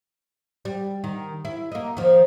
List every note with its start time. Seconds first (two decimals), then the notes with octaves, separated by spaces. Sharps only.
0.65 G3
1.04 D#3
1.45 E4
1.72 A#3 D#4
1.97 D#3 F3